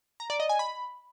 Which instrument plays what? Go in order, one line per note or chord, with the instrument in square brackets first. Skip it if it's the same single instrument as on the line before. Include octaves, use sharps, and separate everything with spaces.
[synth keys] A#5
D5
D#5
G#5
B5